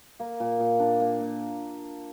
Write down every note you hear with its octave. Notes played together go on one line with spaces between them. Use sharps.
A#3
A#2
A#2
D4
A#3
A#2